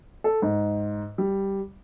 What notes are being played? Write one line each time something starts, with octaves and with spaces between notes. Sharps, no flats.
A4
G#2
G3